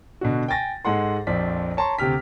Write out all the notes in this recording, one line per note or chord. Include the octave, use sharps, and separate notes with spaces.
B2 D3 F#4
G5 G#5 A6 A#6
G#2 G#3 A4 F#5 C6
A#1 F2 C5 D5 B6
C#5 A5 A#5 C6 C#6
D2 C3 G4 F6 B6